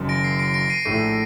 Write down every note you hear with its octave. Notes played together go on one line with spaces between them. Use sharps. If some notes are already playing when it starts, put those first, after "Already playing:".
Already playing: F#1 F#2 D#3
A#6 D7
C7
A#6 D7
A#6 D7
C7 D#7
A#1 A2 A3 C7 D#7